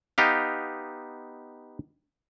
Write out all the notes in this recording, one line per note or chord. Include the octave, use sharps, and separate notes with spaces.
B3 D#4 G4 F5